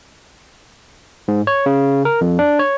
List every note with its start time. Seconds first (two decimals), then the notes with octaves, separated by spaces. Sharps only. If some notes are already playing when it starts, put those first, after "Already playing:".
1.28 G#2
1.47 C#5
1.66 C#3
2.05 A#4
2.21 F2
2.39 D4
2.59 C#5